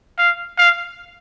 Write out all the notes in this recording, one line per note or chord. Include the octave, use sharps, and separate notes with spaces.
F5
F5